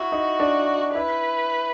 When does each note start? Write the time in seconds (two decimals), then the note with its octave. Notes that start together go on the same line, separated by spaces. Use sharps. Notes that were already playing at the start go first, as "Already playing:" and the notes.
Already playing: E4 F#4
0.12 D#4
0.40 D4
0.95 E4 B4